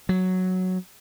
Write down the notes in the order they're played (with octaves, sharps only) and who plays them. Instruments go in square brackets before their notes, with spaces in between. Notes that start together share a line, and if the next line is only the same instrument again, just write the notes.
[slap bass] F#3